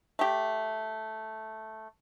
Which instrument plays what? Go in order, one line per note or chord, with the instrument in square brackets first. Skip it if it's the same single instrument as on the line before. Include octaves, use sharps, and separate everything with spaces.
[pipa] A3 G4